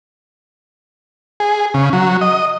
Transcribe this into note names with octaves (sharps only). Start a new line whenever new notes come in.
G#4
C#3
F#3
D#5